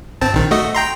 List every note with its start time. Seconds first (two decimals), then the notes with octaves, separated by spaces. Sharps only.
0.21 G1 C4 A5
0.33 A#1 D#3
0.51 A3 F#4 D#5
0.75 G5 A#5 C6